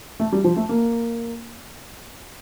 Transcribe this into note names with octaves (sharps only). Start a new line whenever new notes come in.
A3
G3
F3
A3
A#3